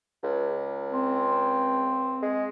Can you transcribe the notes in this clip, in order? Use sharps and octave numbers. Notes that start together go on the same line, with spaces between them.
C#2
C4
G#3